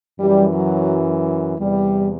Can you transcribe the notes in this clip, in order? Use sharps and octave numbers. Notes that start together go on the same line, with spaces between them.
F#2 E3 G3
F#3
E2 C3 E3 G3